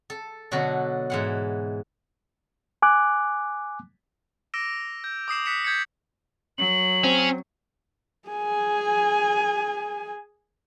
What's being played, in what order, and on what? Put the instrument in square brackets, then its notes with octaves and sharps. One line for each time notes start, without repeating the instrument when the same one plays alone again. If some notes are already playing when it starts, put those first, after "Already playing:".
[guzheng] A4
B2 D3 F#3 F#4 A4
G#2 E3 F#5
[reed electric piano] G#5 D6 F#6
[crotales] D6 E6 A#6 D7 E7
G6
D6 D#6 C7 E7
D#6 F#6 B6 C#7 E7
D#6 G6 G#6 A#6 B6 C#7
[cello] F#3 [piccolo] F#7
[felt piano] C4 [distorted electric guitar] C#4
[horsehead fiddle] G#4 G#5